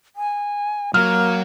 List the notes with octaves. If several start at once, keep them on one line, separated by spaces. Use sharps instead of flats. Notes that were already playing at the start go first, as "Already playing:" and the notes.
G#5
F#3 A#3 F6